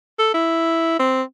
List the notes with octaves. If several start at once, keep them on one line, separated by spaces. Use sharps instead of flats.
A4
E4
C4